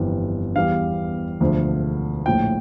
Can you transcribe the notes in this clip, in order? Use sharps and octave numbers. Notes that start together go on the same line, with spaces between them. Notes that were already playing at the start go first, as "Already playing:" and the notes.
Already playing: G1 F2 E3 G3
E2 E3 G3 F5
E1 D2 D3 F3
A#1 A2 F3 G5